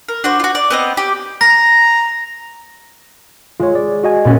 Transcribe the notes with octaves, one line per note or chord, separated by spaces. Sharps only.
A#4
D4 F#4 C5
F4 F#4
D5
B3 C4 D#5
G4
A#5 A#6
G#3 F4 C#5
D5
F#4 D#5 G#5
A#2 B3 C#4